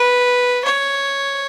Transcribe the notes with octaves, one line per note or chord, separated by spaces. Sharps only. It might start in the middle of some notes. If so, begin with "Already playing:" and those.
Already playing: B4
C#5